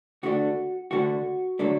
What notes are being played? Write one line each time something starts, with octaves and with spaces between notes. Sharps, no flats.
D2 D3 A3 D4 F#4
D2 D3 A3 D4 F#4
D3 F#3 A3 D4